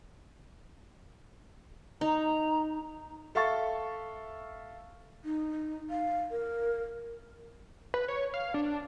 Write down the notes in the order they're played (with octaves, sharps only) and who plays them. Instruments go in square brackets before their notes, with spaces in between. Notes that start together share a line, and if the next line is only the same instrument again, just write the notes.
[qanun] D#4 [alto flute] A#5
[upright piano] A4 E5 F5 C#6 A6
[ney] D#4
F5
A#4
[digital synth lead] B4
C#5
F5
D4